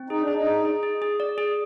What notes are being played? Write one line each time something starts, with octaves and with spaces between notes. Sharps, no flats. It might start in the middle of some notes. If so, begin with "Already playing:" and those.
Already playing: C4
D#4 G#4
D4
G#4
D#4
G#4
G#4
G#4
G#4
D5
G#4